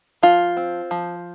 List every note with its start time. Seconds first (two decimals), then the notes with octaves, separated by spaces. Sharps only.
0.23 F3 F4
0.57 C4
0.91 F3